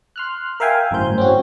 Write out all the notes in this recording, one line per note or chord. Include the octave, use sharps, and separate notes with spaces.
C6 F6 F#6
A#4 E5 F5 G5 G#5
G1 F#2 A2 C5 G6
C4 C#4 F#4